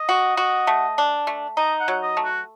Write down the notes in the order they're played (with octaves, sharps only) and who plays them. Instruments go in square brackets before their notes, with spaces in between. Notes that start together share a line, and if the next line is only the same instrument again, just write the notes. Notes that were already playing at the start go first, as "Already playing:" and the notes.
Already playing: [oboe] D#5
[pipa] F#4
F#4
A3
D4
A3
[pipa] D#4 [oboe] D#5
[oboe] F#5
[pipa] F#3
[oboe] D#5
[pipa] A3
[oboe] F#4